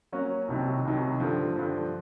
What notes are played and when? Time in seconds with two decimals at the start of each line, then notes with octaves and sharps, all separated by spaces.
0.12 F#3 A#3 C#4 F#4
0.48 C2 C3 D#3 F#3
0.85 C2 C3 D#3 F#3
1.20 G2 D3 F3
1.56 G2 D3 F3